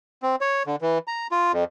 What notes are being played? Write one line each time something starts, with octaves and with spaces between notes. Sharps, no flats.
C4
C#5
D3
E3
A#5
F4
F2